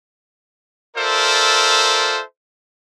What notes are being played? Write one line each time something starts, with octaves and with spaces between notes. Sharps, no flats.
F4 A4 A#4 C5 D5 E5